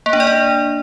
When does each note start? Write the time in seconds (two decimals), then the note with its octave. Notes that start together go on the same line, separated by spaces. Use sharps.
0.06 A#3
0.13 D4
0.20 D5
0.27 D4